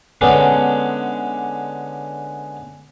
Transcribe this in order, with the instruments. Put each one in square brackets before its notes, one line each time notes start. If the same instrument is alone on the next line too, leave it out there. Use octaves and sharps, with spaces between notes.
[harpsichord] D3 G#3 B3 C#4 D4